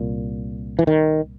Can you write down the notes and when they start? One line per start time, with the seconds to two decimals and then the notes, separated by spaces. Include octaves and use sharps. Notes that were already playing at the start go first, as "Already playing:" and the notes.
Already playing: C2 A#2
0.79 E3
0.87 D#3